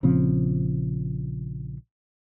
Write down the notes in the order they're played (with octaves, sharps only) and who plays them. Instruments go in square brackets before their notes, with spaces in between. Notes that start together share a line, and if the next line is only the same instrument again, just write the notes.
[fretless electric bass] A#1 C#3 F3 C4